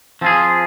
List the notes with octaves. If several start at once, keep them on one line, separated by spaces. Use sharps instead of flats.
F3 C4 F4 G#4